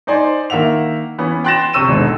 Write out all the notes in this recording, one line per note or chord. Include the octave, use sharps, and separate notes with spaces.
D#4 C5 D5 G#5 C6
D#3 A#3 E5 F#5 F7
E3 B3 C#4
G5 C6 F#6 A6 A#6 E7
C3 C5 C#6 E6 D#7 E7
G#1 B2 D3